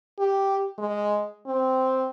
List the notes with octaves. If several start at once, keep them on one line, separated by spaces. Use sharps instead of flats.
G4
G#3
C4